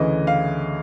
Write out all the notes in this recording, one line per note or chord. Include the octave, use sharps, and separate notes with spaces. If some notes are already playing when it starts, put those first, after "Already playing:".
Already playing: D2 C#3 E3 D#5
F5